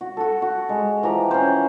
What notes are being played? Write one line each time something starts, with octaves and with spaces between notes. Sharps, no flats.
F#4
F#4 A4
F#4
G#3
E3 F3 G4 A#5
C#4 C5